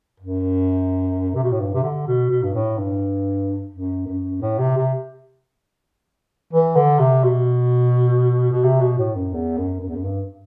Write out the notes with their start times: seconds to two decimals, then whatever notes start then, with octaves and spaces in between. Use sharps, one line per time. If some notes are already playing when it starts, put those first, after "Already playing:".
0.20 F#2
1.35 C3
1.44 B2
1.52 A2
1.60 G2
1.74 C3
1.83 D3
2.07 B2
2.30 B2
2.43 G2
2.54 A2
2.78 G2
3.72 F#2
4.07 F#2
4.42 A2
4.59 C3
4.77 C3
6.53 E3
6.76 D3
6.99 C3
7.24 B2
8.52 B2
8.64 C3
8.81 B2
8.98 A2
9.16 F#2
9.33 E2
9.58 F#2
9.81 F#2
9.88 E2
9.96 F#2
10.04 G2